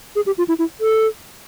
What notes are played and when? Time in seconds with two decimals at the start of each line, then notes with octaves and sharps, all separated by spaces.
0.16 G#4
0.26 G4
0.38 F4
0.48 E4
0.59 E4
0.80 A4